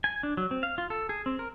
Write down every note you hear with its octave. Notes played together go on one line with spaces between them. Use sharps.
G#5
D4
F#3
C4
F5
F4
A4
G#4
C4
A#4